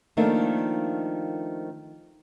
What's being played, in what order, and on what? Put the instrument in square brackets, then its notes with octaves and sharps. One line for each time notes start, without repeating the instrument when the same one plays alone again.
[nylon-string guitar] D#3 F3 A3 A#3 D4 D#4